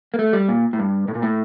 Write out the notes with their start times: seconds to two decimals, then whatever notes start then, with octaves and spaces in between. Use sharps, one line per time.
0.14 A#3
0.19 A3
0.33 G3
0.48 A#2
0.73 A2
0.79 G2
1.08 A2
1.15 A#2
1.22 A2